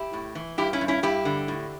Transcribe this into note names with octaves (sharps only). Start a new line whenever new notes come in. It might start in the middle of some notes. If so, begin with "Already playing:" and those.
Already playing: E4 G4
A2
E3
G2 E4 G4
C#4 E4
G2
C#4 E4
G2 E4 G4
D3
A2